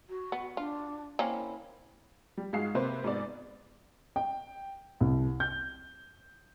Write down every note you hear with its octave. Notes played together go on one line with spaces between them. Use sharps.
F#4
B3
D4 F4
A#3 C4 C#4 E4
G3
G#2 G#3 F#4 F5 C7
C3 A#3 B4 C5
G#2 B3 D5
G5
C2
G6